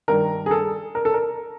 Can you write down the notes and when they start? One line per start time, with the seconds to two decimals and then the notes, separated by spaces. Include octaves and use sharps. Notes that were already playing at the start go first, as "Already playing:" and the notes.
0.08 G2 D#3 A#4
0.46 G#4
0.51 A4
0.95 A#4
1.05 A4
1.14 A#4